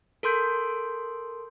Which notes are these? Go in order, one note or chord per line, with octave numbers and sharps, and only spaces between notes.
A4 A#4 C6 G6 D7